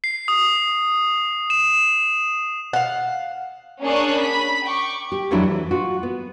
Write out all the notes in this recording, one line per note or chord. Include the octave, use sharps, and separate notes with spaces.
C7
D#6
E7
F5 F#5
A#3 C#4 D4 G#4 C#6 F#6
B5 B6
G5 C#6 D6
G4
F2 E3 F#3 A3 D4 E4
E3
F4 F#4
B3